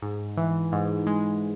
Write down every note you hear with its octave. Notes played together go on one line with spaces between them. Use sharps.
G#2
E3
G#2
G#3